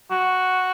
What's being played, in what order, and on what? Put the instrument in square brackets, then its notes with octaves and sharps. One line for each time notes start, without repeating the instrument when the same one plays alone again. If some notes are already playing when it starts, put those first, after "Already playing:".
[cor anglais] F#4